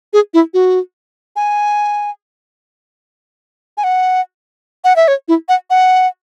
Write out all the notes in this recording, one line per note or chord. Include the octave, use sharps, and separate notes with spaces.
G#4
E4
F#4
G#5
G#5
F#5
F#5
E5
C#5
E4
F#5
F#5